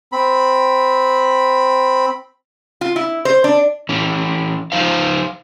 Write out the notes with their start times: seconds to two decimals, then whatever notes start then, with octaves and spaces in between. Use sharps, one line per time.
0.12 C4 B5
2.81 F4
2.96 E4
3.25 C5
3.44 D4
3.89 E3 C#4
4.72 F3 D#4 C5 F5